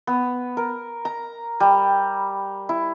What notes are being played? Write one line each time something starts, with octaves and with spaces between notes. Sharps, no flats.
B3
A#4
A#5
G3
E4